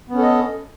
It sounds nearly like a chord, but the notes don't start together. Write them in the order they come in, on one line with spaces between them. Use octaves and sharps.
B3 C#4 A4 D#5